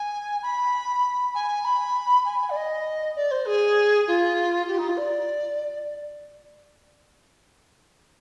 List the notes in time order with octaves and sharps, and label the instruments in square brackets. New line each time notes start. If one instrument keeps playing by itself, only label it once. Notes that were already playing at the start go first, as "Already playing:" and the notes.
Already playing: [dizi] G#5
B5
G#5
B5
G#5
G#5
D5
D#5
D5
C5
G#4
F4
G4
D#4
F4
D5